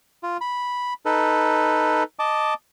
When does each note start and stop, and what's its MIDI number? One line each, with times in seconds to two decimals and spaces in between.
0.23 0.37 65
0.41 0.93 83
1.06 2.03 63
1.06 2.03 69
1.06 2.03 71
2.19 2.54 75
2.19 2.54 81
2.19 2.54 86